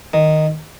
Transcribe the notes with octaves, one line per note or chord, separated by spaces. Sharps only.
D#3